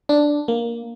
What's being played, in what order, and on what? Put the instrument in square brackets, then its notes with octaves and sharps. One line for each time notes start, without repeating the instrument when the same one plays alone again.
[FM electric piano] D4
A#3